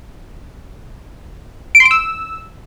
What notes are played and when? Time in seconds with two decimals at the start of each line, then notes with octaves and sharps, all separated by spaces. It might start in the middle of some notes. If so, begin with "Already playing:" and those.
1.75 D7
1.80 C6
1.85 D7
1.91 E6